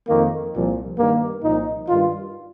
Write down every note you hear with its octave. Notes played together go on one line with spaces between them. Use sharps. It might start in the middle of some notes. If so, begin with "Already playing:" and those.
F2 D#3 A#3
C2 A#2 F3
G2 D#3 A#3
C2 A#2 F3 D#4
G2 D#3 F4